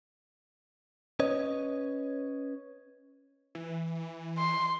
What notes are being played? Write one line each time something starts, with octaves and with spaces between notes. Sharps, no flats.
C#4 B4 C#5 D#5
E3
C6